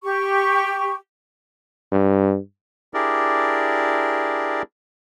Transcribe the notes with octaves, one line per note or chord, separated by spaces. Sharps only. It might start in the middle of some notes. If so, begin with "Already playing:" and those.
G4 C#6
G2
D4 E4 G4 G#4 A#4 D5